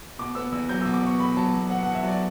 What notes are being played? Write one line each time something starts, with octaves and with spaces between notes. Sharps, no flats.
B2 D6
B3 E6
E2 E6
F#3 G6
E6
B2
D6
B3 C#6
E2 B5
F#3 A5
B2
B3 F#5
F#5
E2
E5
F#3 D5